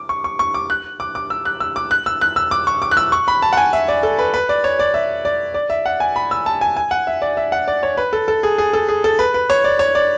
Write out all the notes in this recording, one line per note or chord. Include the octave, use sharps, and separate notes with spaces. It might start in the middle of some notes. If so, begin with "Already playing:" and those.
Already playing: D6
C#6
C#6
C#6
D6
F#6
D6
D6
E6
F#6
E6
D6
F#6
E6
F#6
E6
D6
C#6
D6
F#6
E6
C#6
B5
A5
F#5
G#5
E5
D5
A4
B4
B4
D5
C#5
D5
E5
D5
D5
E5
F#5
G#5
B5
E6
A5
G#5
G#5
F#5
E5
D5
E5
F#5
D5
C#5
B4
A4
A4
G#4
G#4
A4
G#4
A4
B4
B4
C#5
D5
C#5
D5